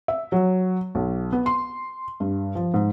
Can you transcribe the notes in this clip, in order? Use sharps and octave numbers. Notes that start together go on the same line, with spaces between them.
E5
F#3
B1
B3
C6
G2
F3
G#2